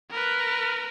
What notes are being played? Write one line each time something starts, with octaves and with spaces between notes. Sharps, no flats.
A#4 B4